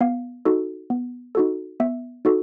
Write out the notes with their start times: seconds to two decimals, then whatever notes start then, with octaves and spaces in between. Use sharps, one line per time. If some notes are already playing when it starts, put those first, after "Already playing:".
0.01 B3 F5
0.45 D#4 F#4 A4
0.90 B3
1.35 D#4 F#4 A4
1.80 B3 E5
2.25 D#4 F#4 A4